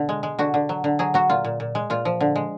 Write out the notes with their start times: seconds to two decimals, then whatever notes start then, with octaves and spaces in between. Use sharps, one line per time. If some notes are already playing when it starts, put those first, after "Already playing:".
Already playing: B2 D3
0.09 G#3
0.23 G#3
0.39 D3 F#4
0.54 D3
0.69 F#3
0.84 D3
0.99 F#3 G#4
1.14 F#3 F#4
1.30 A#2 F4
1.45 A#2
1.60 A#2
1.75 G#3
1.90 A#2 F4
2.05 F3
2.21 D3
2.36 G#3